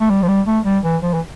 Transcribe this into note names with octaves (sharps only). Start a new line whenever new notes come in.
A3
G3
F3
G3
A3
G3
E3
F3
E3